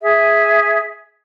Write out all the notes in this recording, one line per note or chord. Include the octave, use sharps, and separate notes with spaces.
G#4 E5